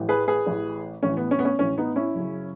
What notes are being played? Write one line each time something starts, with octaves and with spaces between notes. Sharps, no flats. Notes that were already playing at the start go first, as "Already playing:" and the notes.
Already playing: A1 A2 E3
G#4 B4
G#4 B4
A1 A2 E3
A1 A2 E3 C#4
B3
C#4
B3
C#4
A1 A2 E3 C#4
B3 D#4
C#4 E4
F#1 F#2 C#3